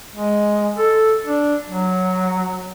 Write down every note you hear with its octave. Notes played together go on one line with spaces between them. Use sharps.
G#3
A4
D4
F#3